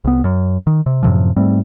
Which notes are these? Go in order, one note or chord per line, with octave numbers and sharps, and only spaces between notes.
C2 B3
F#2
D#3
C3
F#2 A2 C3 F3
G#2 G3 A3 C4